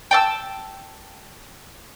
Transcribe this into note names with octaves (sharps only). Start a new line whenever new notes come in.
G5 A5 E6